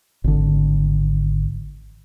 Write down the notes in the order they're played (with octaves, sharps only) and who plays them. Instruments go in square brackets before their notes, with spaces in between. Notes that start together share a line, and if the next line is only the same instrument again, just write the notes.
[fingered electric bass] G#1 D3